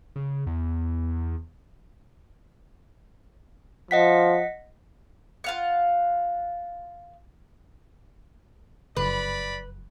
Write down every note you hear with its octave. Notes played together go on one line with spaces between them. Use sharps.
C#3
E2
F3 D#5 F#5 B6
F4 F5 F#5
F1 F#2 C#3 B4 D5 B5